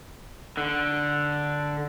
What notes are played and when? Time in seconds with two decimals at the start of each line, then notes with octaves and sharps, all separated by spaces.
0.57 D3